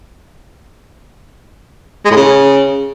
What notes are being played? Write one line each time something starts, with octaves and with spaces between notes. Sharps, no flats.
G#3
A2
C#3